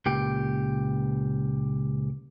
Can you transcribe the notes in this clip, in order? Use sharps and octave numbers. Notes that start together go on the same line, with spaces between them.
C#2 A#2 G4